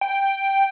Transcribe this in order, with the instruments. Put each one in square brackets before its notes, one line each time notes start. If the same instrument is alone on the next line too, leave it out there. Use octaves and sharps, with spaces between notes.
[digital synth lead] G5